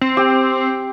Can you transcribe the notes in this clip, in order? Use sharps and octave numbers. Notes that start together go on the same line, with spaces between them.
C4
G4